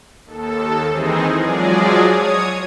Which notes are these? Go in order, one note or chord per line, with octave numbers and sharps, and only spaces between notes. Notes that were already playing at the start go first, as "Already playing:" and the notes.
D#2 A4
D#3 E3 G#3 C4 D#4 G#4
F3 F#3 G#3 G#4 D5
C#5 D#6 G#6